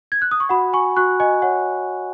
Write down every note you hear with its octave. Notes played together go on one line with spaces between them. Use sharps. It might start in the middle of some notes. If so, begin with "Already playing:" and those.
G#6
F#6
D#6
C#6
F#4 F#5 B5
G#5 C#6
F#4 C#6 F#6
D#5 G#5
C#5 F#5